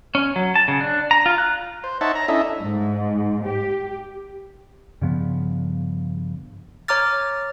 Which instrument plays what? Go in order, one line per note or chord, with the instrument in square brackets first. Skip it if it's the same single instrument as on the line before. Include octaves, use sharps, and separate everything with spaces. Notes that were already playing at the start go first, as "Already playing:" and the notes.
[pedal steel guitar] C#4
F#3
A5
C#3
D4
A#5
F4
F#6
[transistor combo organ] C5
D#4 C5 C#5 E5 F#5 A5
A#5
C#4 D4 E4 A4 D#5 E5
[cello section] G#2
G4
[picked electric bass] G2 C#3 F3 B3
[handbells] C#5 A#5 D6 F6 A6